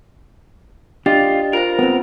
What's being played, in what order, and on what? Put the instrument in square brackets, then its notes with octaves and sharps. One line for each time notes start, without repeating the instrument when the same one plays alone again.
[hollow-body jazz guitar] D4 G4 [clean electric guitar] F4 [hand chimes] D#5
[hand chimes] F4 C5 [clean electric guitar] A#4
[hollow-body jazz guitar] B3 C4